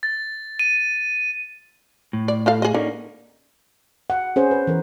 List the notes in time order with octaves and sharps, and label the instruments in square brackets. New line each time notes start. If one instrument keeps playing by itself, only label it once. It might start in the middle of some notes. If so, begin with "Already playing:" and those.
[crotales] A6
D#7
[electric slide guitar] A2
[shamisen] D5
E4 A4 F5
G#4 D#5
[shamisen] D3 [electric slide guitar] A#3 C#4 D#4
[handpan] F#5
C#4 G#4 C5
B4
E3 A#4